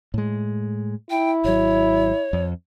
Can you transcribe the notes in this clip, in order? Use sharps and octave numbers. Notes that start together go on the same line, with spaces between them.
A2 G#3
E4 G5
G#1 F#3 C#5
F2